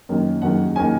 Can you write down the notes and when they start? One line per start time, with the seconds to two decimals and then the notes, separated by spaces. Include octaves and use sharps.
0.09 F#2 D#3 A#3
0.42 F#2 D#3 A#3 F#5
0.76 D#3 A#3 G#5